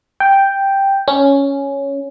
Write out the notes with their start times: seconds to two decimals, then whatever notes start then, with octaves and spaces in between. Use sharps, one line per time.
0.20 G5
1.08 C#4